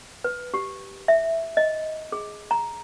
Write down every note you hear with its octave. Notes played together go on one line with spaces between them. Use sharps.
B4
G4
E5
D#5
G#4
A#5